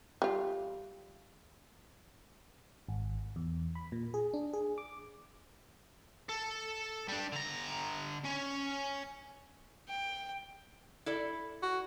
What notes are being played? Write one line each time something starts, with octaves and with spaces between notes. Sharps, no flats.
G3 F4
G#1
E2
B5
A#2
G#4
D4
G#4
D6
A4
G3 D4
D3 A#5
C#4
G5
E4 A4 D5
F#4